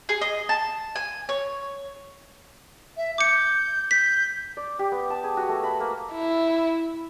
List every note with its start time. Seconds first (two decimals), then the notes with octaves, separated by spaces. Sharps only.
0.09 G#4
0.21 D#5
0.49 A5
0.96 G#5
1.29 C#5
2.96 E5
3.18 D6 G6 C#7
3.91 G6 B6
4.57 D5
4.79 G4
4.92 B3
5.10 A5
5.24 G#4
5.37 F#4
5.49 A3
5.64 B5
5.80 A#3
6.13 E4